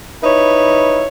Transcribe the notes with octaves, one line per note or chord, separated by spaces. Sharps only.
D#4 E4 B4 C#5